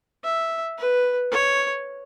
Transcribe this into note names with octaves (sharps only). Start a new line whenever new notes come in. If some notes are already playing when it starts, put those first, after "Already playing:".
E5
B4
C#5